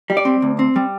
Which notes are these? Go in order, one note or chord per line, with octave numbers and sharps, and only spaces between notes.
G3
D5
C4
D2
C4
G3